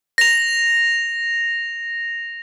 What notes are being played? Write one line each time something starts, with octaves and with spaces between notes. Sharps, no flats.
A#6 F7